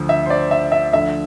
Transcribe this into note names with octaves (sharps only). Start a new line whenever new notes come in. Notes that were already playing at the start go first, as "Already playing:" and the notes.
Already playing: D2 D3 F3
E5
C5
D5
E5
E5
D2 D3 F3 E5